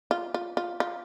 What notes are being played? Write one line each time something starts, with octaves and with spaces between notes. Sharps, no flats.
F4
F4
F4
F4